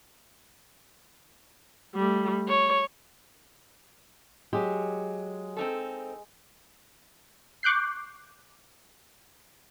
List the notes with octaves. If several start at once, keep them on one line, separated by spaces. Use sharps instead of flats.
G3 A3
C#5
F#3 G#3 G4
C4 D#4 A4
C#6 D6 F#6 G6 C7